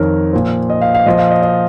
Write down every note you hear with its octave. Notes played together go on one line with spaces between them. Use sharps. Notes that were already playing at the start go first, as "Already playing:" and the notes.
Already playing: F2 D#3 A#4 C#5
A#2 F3
D#5
F5
F5
A#2 F3 D#5
F5
D#5
D#5